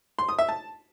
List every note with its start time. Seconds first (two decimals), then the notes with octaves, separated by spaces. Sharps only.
0.19 C6
0.29 D#6
0.39 E5
0.49 A5